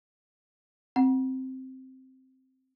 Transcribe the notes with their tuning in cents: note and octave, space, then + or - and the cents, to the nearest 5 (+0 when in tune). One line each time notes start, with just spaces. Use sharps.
C4 +0 F#5 +0